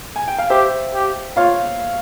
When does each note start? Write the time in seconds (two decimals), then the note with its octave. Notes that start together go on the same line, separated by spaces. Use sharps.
0.16 G#5
0.28 G5
0.39 F5
0.50 G4 C5 E5
0.94 G4
1.37 F4 C#5 F5